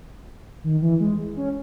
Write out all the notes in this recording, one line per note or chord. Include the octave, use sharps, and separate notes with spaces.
D#3
E3
G#3
C#4